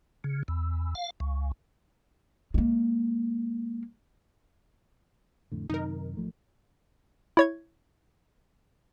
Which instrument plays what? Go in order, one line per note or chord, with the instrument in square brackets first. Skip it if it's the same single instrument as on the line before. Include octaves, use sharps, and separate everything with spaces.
[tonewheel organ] C#3
E2
F5
C#2
[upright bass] G#3 A#3
[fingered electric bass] F2 A2 D3
[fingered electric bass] F#2 C3 D#3 [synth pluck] D#4 A#4
[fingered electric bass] A1 F3 A3
[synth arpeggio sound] E4 C#5 G#6